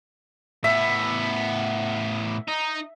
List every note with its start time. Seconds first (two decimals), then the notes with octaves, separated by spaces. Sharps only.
0.64 A2 B3 E5
2.48 D#4